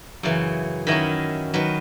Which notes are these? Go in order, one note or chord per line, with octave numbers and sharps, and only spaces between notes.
F#2 C#3 E3
D#3 F#3 C#4 E4 D#5
D#3 F#3 B4